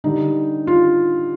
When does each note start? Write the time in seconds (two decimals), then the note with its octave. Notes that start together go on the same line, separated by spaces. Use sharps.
0.04 D3 G3 D#4
0.67 F4